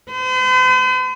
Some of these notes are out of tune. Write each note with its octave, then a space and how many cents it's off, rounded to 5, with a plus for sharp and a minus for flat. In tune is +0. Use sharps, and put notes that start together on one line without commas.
C5 -45